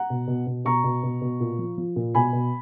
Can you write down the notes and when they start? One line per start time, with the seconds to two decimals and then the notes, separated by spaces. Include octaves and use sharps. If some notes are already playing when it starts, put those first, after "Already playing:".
Already playing: F#5 A#5
0.10 B2
0.28 B2
0.47 B2
0.65 B2 A#5 C#6
0.84 B2
1.03 B2
1.22 B2
1.40 A#2
1.59 F3
1.78 F3
1.96 A#2
2.14 B2 G#5 B5
2.33 B2